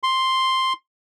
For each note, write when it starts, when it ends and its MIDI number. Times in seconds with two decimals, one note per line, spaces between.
0.03 0.73 84